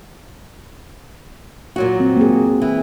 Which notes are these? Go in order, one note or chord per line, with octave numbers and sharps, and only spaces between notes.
A#2 F#3 F#4
C4
A#3 G#4
E3